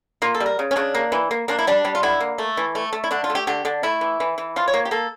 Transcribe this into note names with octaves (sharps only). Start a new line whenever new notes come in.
A#3 F4
A4
G3
A#4
C#3
C#4
C#3 D4
A#3
E3
A#3
A#3 D4
E4
G3 D4
G3
F4
D3 E4
A#3
A3
E3
A3
A3
E4
D3 D4
F4
A3
G4
D3 G4
D3 D4
A3 E4
E3
E3
E3
F3 F4
C#5
A#3
G4
A#3 A4